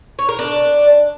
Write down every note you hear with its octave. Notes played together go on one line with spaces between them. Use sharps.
C#5
A#4
D4